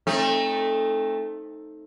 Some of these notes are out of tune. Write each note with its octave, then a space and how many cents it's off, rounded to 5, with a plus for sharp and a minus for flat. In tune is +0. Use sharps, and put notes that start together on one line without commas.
A3 +0 C4 +35 D#4 +0